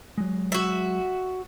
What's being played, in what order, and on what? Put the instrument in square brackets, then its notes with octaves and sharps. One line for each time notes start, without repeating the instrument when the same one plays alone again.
[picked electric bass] F#3 G#3
[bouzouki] F#4 E5